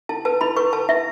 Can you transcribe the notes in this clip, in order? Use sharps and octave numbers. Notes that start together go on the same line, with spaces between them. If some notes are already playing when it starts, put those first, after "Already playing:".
E4 A5
B4 A5
E4 B5
B4 C#6
B4 A5
E4 E5